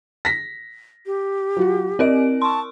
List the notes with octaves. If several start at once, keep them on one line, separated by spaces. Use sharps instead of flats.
A#6 B6
G4
F#3 F4 F#4
C4 A#4 D5 D#5 D7
A5 C6 C#6